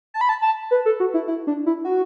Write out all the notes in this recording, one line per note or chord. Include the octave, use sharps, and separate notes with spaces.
A5
B5
A5
A5
B4
A4
F#4
E4
E4
D4
E4
F#4